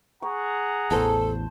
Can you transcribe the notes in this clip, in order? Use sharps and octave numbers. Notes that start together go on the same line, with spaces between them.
G#4 F#5 A#5 C#6
A1 E2 A4 C5 A5